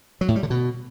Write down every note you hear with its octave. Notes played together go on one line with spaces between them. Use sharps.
F#3
A2
G3
D3
B2